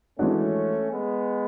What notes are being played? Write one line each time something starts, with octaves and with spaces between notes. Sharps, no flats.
E3 G#3 A3 C#4 D4 F#4
G#3 B3